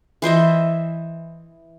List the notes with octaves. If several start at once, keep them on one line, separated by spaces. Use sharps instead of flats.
E3 C5 D#5 E5